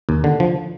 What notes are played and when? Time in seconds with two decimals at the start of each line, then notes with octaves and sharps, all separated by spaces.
0.09 D#2
0.24 D3
0.40 F3